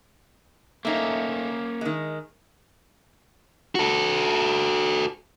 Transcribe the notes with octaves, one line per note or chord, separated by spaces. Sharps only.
A3 A#3 C#4 D#4
D#3 G#3
F#4 A4